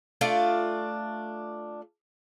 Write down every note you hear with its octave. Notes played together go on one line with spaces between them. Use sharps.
A3 D4 F4 D5